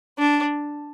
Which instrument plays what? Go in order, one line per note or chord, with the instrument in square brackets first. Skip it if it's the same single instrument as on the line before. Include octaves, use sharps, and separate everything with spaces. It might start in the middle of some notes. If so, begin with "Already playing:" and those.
[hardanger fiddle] D4